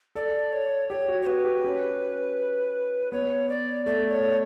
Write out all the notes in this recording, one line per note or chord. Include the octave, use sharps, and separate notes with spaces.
A4 D5
C#5
G4 C#5
F#4
C#5
F#4 B4
G4
C#4
B3 C#5
D5
A3 D5
C#5